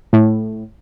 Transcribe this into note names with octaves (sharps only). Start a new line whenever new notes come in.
A2